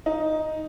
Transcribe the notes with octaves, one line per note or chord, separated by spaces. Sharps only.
D#4